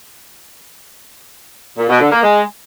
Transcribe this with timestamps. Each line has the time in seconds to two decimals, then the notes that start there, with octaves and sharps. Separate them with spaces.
1.78 A#2
1.89 B2
2.01 D3
2.12 A#3
2.23 G#3